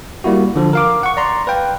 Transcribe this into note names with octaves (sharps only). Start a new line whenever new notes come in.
G3 A#3 E4 F#4
D3 F3 A4
A#4 F5 D6
F#5 C#6
D5 A#5 C6
B4 F5 G5